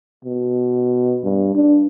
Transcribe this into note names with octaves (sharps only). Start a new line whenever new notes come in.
B2
G2
D4